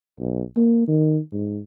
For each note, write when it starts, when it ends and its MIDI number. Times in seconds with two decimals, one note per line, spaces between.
0.19 0.42 35
0.56 0.83 58
0.88 1.19 51
1.33 1.59 44